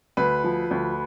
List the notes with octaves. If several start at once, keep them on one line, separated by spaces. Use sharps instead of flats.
D2 B4
F3
D2